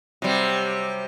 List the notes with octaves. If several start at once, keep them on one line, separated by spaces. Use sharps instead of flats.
C3 F#3 G3 C4